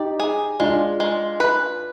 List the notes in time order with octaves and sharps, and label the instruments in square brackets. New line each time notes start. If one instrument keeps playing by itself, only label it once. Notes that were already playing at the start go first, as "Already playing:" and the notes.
Already playing: [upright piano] D#4 G4 [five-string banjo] D5
[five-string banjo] G#4
[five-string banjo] G#3 [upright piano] D4 F4
[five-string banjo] G#3
B4